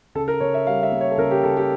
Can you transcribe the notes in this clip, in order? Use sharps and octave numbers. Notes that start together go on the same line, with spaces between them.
C#3 A4
A#4
C#3 C#5
E5
G3 F5
E5
A#3
C#5
A4
C#3 A#4
G4
C#3 A4
G4